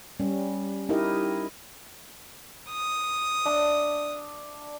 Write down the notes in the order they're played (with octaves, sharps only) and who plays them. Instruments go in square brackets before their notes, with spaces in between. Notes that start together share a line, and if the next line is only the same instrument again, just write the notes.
[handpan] G3 C#4
D#4 E4 G4 A#4 D#5
[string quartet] D#6
[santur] D4 D5 E5